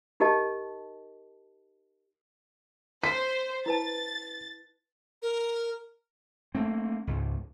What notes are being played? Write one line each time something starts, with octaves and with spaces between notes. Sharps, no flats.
D#4 G4 A#4 D#5 A5
C5 B6
E4 B4 A5 A6
A#4
A3 A#3 C4
C#2 G#2